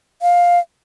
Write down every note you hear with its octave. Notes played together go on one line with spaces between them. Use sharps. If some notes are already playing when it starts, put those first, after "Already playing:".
F5